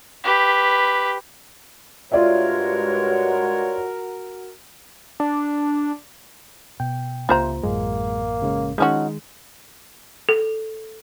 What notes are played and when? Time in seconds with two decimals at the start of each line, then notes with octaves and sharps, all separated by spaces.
0.24 G4 B4
2.12 G2 G#3 F4 F#4 A#4 C#5 D5 E5
5.20 D4
6.80 B2 G5
7.29 C#2 C3 A#3 F4 C5 A#5
7.63 A1 F#2 G#3 A#3
8.42 C#3 G#3 C#4
8.78 D#3 F3 G#3 C#4 D#4 F#4
10.29 A4